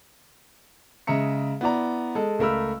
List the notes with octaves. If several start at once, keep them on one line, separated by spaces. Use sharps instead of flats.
C#3 G#3 E5 A#5 C#7
B3 E4 D5 A#5
G#3 A4
C#2 A3 A#4 B5 E6